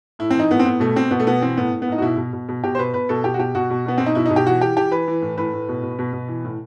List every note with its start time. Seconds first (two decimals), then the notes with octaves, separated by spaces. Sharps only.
0.19 A2 E4
0.30 C4
0.35 E3 D#4
0.51 A2 B3
0.59 C4
0.65 A2 B3
0.80 B2 A3
0.96 B2 C4
1.11 B2 B3
1.20 A3
1.26 B2 B3
1.41 E3 C4
1.57 A2 B3
1.72 A2
1.82 B3
1.88 A2 D#4
1.98 F#4
2.02 B2 E4
2.17 B2
2.33 B2
2.49 B2
2.64 B2 G4
2.75 C5
2.79 B2 B4
2.94 B2 B4
3.09 B2 A4
3.24 B2 G4
3.34 F#4
3.39 B2 G4
3.55 B2 F#4
3.70 B2
3.86 B2 B3
3.98 B2 C4
4.06 D#4
4.15 B2 E4
4.26 D#4
4.30 B2
4.36 G4
4.46 E3 F#4
4.61 E3 G4
4.77 E3 G4
4.91 E3 B4
5.08 E3
5.22 A2
5.38 A2 B4
5.53 A2
5.69 B2
5.83 B2
5.99 B2
6.13 B2
6.28 E3
6.44 A2